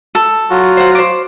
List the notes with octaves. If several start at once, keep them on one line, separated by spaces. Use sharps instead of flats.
A4
F#3 F4 F#4
C5 F#5
C5 D6